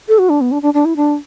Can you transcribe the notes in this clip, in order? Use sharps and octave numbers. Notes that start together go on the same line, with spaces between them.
A4
F#4
D4
B3
D4
D4
D4
E4
D4